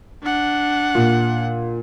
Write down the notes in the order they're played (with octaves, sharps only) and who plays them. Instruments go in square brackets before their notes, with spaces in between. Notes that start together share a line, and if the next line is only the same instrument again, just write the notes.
[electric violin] D4 F#5
[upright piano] A#2